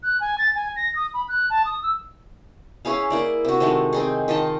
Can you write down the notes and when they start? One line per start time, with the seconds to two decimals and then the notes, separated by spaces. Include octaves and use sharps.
0.03 F#6
0.20 G#5
0.38 A6
0.55 G#5
0.76 A#6
0.95 D#6
1.14 B5
1.28 F#6
1.50 A5
1.65 D#6
1.83 E6
2.85 C#4 E4 G#4 F5
3.10 A#3 E4 D5
3.45 C3 F#4
3.60 C3 D#3 G#3 A3
3.93 C4 D#4 G#4
4.28 D#3 F4 D#5 A5